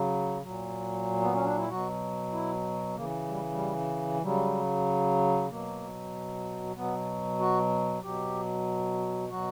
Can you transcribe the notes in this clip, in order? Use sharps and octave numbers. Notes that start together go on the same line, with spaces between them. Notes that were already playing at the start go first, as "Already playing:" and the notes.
Already playing: C#3 F#3
A#2 F#3
B3
C#4
D4
E4
B2 F#3 F#4
E4
C#3 E3 A#3
G3
G3
C#3 F#3 G3
B2 F#3 A#3
B2 F#3 B3
F#4
B2 F#3 G4
B2 F#3 F#4